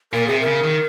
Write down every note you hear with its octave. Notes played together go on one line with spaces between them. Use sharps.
A#2 A#4
C3 G#4
A#4
C#3
D#3